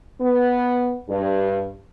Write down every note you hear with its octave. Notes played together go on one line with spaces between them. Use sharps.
B3
G2